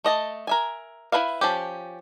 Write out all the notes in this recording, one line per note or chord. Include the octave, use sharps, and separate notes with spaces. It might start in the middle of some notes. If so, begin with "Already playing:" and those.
A3 D#5 A5
A#4 E5 G#5
E4 G#4 B4 E5 F5
F3 C#4 G4